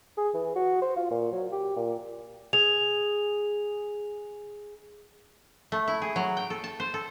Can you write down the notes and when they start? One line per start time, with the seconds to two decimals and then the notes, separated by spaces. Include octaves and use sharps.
0.18 G#4
0.34 E3
0.56 F#4
0.82 C5
0.97 F4
1.11 A#2
1.32 F#3
1.52 G4
1.76 A#2
2.53 G#4 F7
5.72 A3
5.88 E4
6.02 G#4
6.16 F#3
6.37 G5
6.50 A4
6.64 A5
6.80 C5
6.94 A4